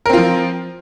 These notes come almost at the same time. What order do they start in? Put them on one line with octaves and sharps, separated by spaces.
A#4 C4 F4 F3